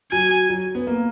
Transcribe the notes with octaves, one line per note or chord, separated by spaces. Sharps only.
F#3 G#5
F#3
B3
A#3